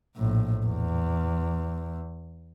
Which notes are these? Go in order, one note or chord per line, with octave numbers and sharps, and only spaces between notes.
A#1 A2
E2